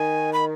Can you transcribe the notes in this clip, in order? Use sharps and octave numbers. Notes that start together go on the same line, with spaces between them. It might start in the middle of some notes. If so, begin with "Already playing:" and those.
Already playing: D#3 G#5
B5